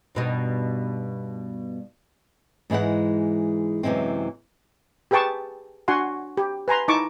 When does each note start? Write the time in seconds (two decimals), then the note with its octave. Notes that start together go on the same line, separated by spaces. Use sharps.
0.15 G2 B2 D#4
2.70 G#2 E3 G#3 E4 F#5
3.83 F#2 C3 E3 G#3 C4
5.11 G4 G#4 B4 G5 A5 C#6
5.88 D4 F#4 F#5 G#5 C6
6.37 G4
6.68 B4 G#5 A#5 C6
6.88 D#4 E4 A5 C#6 D6